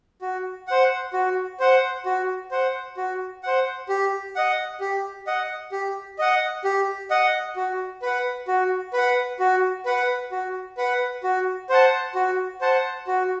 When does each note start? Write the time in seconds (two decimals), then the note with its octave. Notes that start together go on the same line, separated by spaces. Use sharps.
0.22 F#4
0.67 C5 F#5
1.13 F#4
1.60 C5 F#5
2.06 F#4
2.51 C5 F#5
2.97 F#4
3.43 C5 F#5
3.89 G4
4.36 D#5 F#5
4.80 G4
5.27 D#5 F#5
5.72 G4
6.19 D#5 F#5
6.64 G4
7.10 D#5 F#5
7.56 F#4
8.02 B4 F#5
8.48 F#4
8.93 B4 F#5
9.39 F#4
9.86 B4 F#5
10.32 F#4
10.77 B4 F#5
11.23 F#4
11.70 C5 F#5 A5
12.15 F#4
12.61 C5 F#5 A5
13.07 F#4